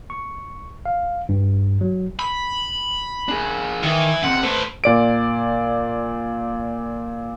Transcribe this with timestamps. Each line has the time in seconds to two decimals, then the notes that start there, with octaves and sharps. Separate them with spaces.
0.10 C#6
0.86 F5
1.29 G2
1.81 F#3
2.19 B5
3.29 D4 G#4
3.83 D#3 E3
4.23 B2 C4 F#5
4.43 A3 B4 C5
4.84 A#2 D5 D7